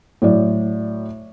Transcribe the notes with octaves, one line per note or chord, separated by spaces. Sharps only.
A2 F#3 D5